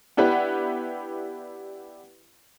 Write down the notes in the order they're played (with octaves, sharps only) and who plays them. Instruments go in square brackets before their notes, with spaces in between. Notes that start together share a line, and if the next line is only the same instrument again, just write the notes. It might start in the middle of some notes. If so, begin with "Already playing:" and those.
[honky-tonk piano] B3 D4 E4 G4 B4 F#5